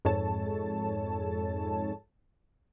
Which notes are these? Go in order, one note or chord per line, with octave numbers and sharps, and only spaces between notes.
F2 G#2 G#3 A4 C#5 A5